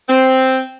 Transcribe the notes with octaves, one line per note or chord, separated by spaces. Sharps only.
C4